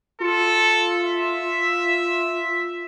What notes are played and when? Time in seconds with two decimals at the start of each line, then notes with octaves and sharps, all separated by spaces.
0.20 F4 A4
1.04 E5